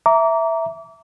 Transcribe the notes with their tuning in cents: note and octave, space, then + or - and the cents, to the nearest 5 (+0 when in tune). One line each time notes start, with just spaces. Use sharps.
E5 +0 A#5 -5 D6 -30